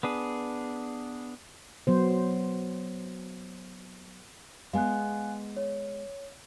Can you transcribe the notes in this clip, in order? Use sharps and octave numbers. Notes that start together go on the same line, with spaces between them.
B3 D4 G#4
F#3 B3 C5
G#3 B3 F5 G#5 F#6
C#5